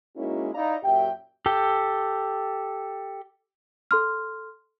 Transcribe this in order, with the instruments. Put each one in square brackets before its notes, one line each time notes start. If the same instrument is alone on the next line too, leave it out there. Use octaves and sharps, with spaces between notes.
[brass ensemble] G#3 A#3 C#4 D#4 E4 F#4
D#4 E4 D5 F5 A#5
F#2 A#2 G4 E5 G5
[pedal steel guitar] G4 A4 G5
[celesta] A4 C6 F6